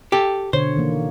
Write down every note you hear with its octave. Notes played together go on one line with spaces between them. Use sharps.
G4 A4
B2 D3 C5 C#5
D#3 E3 A#3